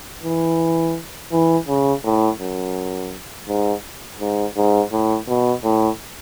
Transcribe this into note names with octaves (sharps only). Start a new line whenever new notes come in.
E3
E3
C#3
A2
F#2
G#2
G#2
G#2
A2
B2
A2